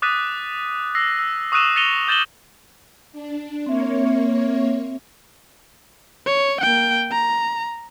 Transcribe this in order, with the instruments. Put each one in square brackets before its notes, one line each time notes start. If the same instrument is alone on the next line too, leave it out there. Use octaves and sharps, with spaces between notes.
[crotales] D6 D#6 F#6 A6 B6 D#7
E6 A#6 C7
E6
C#6 D#6 E6 F#6 D#7 E7
A6 A#6 C#7 D#7 F7 G7
D6 G6 A6 E7 F#7 G7
[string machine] D4
[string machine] A#3 C#5 [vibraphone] C4 E5
[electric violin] C#5
A#3 G5
A#5